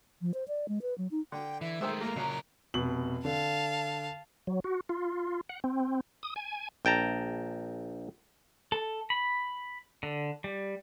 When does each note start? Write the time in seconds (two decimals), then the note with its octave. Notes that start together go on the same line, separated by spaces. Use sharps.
0.21 F3
0.34 C5
0.48 D5
0.68 G#3
0.82 B4
0.98 F#3
1.11 D#4
1.32 D3 G5
1.61 E3 E5
1.81 D#3 G#3 A3 C5 E6
2.01 A#3 A#5
2.16 A#1 C#3 F#3 A#4
2.74 F1 B2 F#7
3.25 D3 F5 A5
4.47 F#3
4.64 F#4
4.89 F4
5.49 F#5
5.64 C4
6.23 D#6
6.36 G#5
6.85 A#1 G5 A5 A#5
8.72 A4
9.10 B5
10.03 D3
10.44 G3